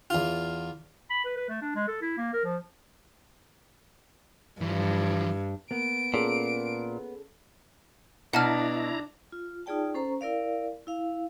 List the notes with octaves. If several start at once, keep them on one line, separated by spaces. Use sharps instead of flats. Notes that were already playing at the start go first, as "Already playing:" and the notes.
E2 F4
B5
B4
B4
A3
D4
G#3
A4
E4
A#3
A#4
F3
G2 E3 F3
A#3 B3 D7
A#2 C#4 G#4 A4
B2 D4 E4 F#5 A5 A#5 F6
F4
D#4 F4 G#4 D5 G5 A5
C#4 A4 C5 A#5 C#6
E4 A#4 D5 F5
E4 F5